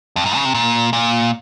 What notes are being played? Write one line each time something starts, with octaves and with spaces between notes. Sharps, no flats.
F2
F#2
C#3
C3
A#2
A#2